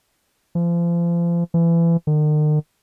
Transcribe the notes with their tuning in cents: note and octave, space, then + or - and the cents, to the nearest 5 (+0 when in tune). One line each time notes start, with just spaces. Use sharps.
F3 -35
E3 +30
D#3 -45